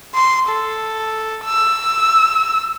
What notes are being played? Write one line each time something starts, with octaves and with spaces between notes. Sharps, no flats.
C6
A4
E6